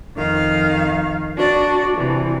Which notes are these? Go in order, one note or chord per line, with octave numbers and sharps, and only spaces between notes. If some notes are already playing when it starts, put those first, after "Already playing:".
F2 D#3 F5
D4 F#4 D5
C3 E3